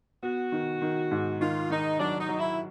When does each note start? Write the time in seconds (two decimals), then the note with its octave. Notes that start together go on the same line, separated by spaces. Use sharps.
0.23 B3 F#4
0.52 D#3
0.82 D#3
1.11 G#2
1.41 D#3 F4
1.70 D#3 D#4
1.99 F#3 D4
2.20 D#4
2.29 F#3
2.39 E4